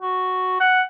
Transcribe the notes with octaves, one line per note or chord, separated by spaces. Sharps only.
F#4
F#5